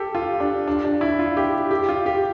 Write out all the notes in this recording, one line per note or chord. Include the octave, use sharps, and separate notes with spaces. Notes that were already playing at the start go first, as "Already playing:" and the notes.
Already playing: G4 A4
F4
D4
D4
D4
E4
F4
G4
G4
F4
G4